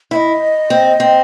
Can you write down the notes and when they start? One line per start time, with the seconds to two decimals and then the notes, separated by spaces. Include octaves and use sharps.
0.11 E4 E5
0.16 D#5
0.70 C4
1.00 C4